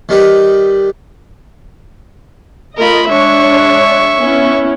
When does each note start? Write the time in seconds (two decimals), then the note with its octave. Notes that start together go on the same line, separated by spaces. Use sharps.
0.09 D#3 G3 D#4 B4
2.78 A3 F4 A#4 D#5 B5
3.09 G#3 D4 C#5 E5 C#6
4.17 B3 C#4 E4